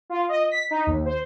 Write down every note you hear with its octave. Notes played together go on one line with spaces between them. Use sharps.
F4
D#5
B6
D#4
D#2
C5